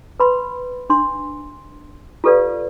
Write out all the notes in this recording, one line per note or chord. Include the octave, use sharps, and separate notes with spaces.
B4 B5 C6
D4 C6
F4 G4 A4 B4 D5 F5